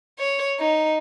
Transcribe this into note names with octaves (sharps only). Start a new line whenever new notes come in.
C#5
D#4